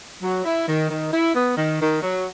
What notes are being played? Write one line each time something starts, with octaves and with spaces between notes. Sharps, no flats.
F#3
E4
D#3
D#3
E4
B3
D#3
D#3
F#3